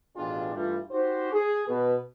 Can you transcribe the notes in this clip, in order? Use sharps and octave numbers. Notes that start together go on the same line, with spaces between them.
A1 B2 D4 F4 G#4 G5
G2 E3 G3 A3 F4
D#4 F#4 G4 C5
G#4
B2 B4